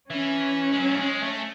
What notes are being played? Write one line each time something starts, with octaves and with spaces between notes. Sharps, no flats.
E3 C#4
G#3
F#3
A3
G#3
A3